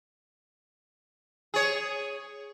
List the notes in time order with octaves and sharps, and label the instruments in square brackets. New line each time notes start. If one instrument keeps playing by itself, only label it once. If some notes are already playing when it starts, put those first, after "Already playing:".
[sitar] G#4 C#5